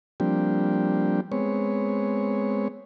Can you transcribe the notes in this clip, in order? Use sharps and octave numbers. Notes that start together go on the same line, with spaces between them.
F3 G3 A#3 C4 D4 G4
G#3 B3 C4 C#5